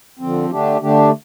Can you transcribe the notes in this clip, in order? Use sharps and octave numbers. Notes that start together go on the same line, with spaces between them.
D3 F3 C4
D3 A3 D4 G4
D3 A3 D4 G4